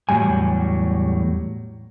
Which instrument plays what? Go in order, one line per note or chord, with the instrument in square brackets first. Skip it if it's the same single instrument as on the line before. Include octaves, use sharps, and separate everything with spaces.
[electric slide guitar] E2 A2 F#3 G3 G#5